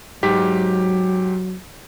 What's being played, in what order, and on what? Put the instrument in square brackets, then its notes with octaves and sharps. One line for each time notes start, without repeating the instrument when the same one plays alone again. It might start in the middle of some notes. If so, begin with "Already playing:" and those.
[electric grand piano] G#2 G4 B6 [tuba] F#3